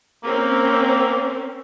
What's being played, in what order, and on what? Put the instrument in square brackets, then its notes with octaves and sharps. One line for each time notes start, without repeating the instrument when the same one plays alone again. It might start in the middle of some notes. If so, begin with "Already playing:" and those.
[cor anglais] A#3 [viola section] C4 C#4 A#4